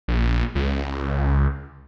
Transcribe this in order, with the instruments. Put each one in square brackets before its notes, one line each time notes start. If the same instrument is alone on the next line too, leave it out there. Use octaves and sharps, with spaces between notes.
[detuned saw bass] A#1
C#2